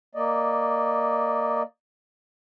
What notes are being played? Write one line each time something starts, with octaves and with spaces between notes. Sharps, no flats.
A#3 D5 D#5